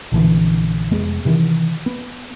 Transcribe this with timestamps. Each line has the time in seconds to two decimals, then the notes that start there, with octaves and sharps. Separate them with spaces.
0.12 A#1 D3 E3
0.91 F1 G#3 B3
1.25 C3 D#3 E3
1.86 B3